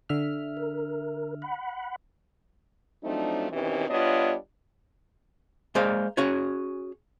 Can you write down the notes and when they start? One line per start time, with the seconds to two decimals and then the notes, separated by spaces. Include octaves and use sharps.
0.09 D3 E5 F6
0.57 A#4
1.42 F#5 B5
3.03 F3 F#3 A3 C4 D4 D#4
3.51 B2 D#3 E3 C4 C#4 G4
3.90 G3 B3 D4 F4 C#5 D#5
5.75 G#3 A#3 C5 D5 F5
6.17 C#4 F#4 G#4 C#5